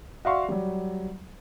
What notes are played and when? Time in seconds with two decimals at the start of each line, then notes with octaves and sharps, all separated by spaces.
0.25 F#4 D5 E5 F5 C6 C#6
0.49 F#3 G3